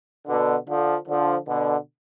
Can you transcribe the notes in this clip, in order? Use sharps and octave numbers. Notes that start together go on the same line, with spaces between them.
B2 D3
D3 F3
D3 F3
B2 D3